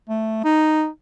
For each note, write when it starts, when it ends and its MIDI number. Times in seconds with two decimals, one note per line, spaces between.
0.09 0.41 57
0.44 0.87 63